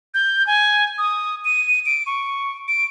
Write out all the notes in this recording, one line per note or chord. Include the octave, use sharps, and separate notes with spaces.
G6
G#5
D#6
D#7
D7
C#6
D7